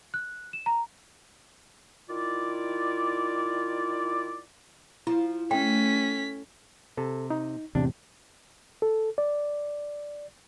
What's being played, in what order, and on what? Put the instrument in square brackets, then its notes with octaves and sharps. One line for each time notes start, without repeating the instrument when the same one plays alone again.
[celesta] F#6
E7
A#5
[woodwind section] D#3 E4 F4 D5
[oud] F3 [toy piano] E4
[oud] A3 [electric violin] C#4 B6 [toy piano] G5
[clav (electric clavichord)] C3 [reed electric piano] A4
[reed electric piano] D#4
[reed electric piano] E2 A2 [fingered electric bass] C3 [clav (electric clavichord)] D4
[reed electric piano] A4
D5